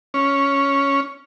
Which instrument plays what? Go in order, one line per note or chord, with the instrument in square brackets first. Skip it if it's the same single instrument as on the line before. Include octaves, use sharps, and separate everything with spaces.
[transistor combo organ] C#4